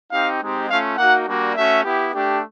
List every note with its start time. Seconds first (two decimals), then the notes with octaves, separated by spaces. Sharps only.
0.12 C4 D#4 G4 F5
0.41 G#3 C4 D#4 G4
0.70 A3 C#4 F4 F5
0.98 A#3 D#4 F#4 F#5
1.27 G3 A#3 D4 F#4
1.55 A3 C#4 F#4 E5
1.84 B3 E4 G4
2.13 A3 D4 G4